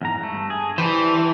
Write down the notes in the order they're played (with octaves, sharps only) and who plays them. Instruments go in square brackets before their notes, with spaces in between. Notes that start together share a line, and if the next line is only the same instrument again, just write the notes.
[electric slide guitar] E2 G#2 A#5
G2 A3
G#4
[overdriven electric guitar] E3 [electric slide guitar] D4 G4 C5